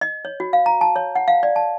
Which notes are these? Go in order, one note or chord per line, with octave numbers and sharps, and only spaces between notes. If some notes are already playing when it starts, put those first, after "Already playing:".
D#5
C#5
F#4
F5
A#5
A5
C#5
F#5
F5
D5
A5